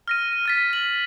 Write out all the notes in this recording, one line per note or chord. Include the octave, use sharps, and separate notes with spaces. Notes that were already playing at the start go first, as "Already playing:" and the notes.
F6 A#6 D#7
D#7
F6 A6 B6
F#7